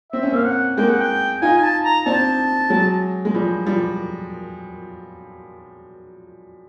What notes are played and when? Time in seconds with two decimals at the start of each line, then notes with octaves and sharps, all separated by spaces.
0.12 C4 E5
0.23 C#4
0.32 A#3 C4 F5
0.46 F#5
0.77 G#3 A#3 G5
0.89 F#5
1.01 G5
1.42 D#4 F4 G#5
1.57 G#5
1.63 A5
1.84 A#5
2.06 C4 D4 A5
2.70 F#3 G#3
3.25 G#3
3.34 F3 G3
3.66 F3 G3